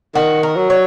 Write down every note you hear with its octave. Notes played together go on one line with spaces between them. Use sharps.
D#3 F#4
A#4
F#3
C#5